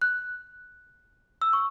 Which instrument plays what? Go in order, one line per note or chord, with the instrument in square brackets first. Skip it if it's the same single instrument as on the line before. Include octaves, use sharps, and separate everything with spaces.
[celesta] F#6
E6
C#6